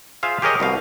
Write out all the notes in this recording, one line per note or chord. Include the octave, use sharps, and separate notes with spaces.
F4 G#4 C5 E5 F5
G4 G#4 A#4 C#5 D#5
C2 B2 F5